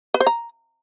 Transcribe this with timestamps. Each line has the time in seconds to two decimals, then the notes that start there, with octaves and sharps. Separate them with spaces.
0.14 B4
0.20 C5
0.27 A#5